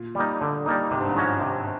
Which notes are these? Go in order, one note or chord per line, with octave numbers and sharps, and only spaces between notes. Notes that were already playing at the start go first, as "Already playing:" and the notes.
Already playing: A#2
G3 A#3 D#4
D3
G3 A#3 D#4
G#2 C3
G2
G#2
F3 G#3 C#4 F#4
G#2 C3